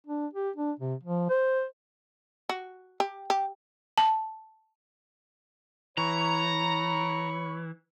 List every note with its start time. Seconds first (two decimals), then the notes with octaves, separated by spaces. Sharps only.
0.06 D4
0.33 G4
0.57 D4
0.79 C3
1.03 F3
1.29 C5
2.49 F#4
3.00 G4
3.30 G4
3.98 A5
5.98 E3 C#5 A#5 B5 C#6